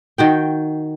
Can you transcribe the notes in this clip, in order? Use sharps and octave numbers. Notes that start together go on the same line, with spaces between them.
D#3 F#4 G5